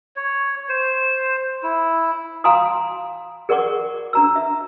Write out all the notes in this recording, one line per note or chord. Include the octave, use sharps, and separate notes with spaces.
C#5
C5
E4
F5 G#5 A#5 C6 D#6
G#4 A#4 D5 F#5 C#6 D6
D4 A#5 E6
E5